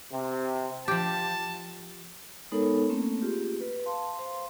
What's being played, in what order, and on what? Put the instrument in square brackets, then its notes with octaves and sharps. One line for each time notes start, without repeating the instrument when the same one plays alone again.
[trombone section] C3
[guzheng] F3 G4 [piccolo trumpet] A5
[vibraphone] G#3 B3 D#4 A4 A#4 C#5
A3 A#3 C4 C#4
F4 G4 G#4
B4
F5 A5 C6
C5 F5 C6